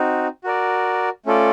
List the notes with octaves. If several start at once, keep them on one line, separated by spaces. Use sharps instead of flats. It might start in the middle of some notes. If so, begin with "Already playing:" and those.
Already playing: C4 D#4 F#4
F#4 A#4 D5
A3 C#4 F4 A4 D5